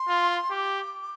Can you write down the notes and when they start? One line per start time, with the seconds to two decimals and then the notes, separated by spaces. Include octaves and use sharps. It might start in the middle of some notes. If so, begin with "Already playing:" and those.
Already playing: C6
0.09 F4
0.51 G4 D6